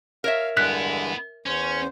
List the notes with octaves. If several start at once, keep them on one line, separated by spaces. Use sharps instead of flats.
A#4 C#5 E5 F5
G2 D3 G#3 B3 E4 F#6 B6
E2 C#4 C5